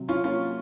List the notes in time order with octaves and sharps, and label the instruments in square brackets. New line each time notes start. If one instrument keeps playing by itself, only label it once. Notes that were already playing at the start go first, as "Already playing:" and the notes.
Already playing: [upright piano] C3 F#3
[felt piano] C#4 F4
[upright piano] A#3 [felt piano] C#4 F4